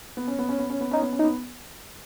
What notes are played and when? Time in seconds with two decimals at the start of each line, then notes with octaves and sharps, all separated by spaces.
0.17 B3
0.28 C#4
0.39 B3
0.49 C#4
0.59 B3
0.70 C#4
0.81 B3
0.91 C#4 D#4
1.02 B3
1.13 C#4
1.19 D#4
1.23 B3